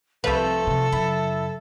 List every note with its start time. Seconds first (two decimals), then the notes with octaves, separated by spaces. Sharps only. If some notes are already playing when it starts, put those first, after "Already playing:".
0.24 C2 F3 A3 A4 B4
0.67 C3
0.92 F#2 C#3 E4